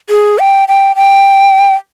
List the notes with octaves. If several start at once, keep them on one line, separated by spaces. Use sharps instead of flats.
G#4
G5
G5
G5